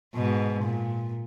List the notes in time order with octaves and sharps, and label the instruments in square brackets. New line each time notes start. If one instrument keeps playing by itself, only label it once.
[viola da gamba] G#2 B2
A#2